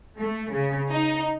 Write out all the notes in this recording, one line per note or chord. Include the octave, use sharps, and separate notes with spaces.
A3
C#3
D#4